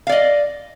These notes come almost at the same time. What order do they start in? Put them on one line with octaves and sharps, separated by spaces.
F5 D5 D#5